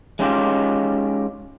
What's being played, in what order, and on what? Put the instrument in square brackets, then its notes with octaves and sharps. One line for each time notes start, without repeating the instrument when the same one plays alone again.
[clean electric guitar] G#3 C#4 D#4 F4 G4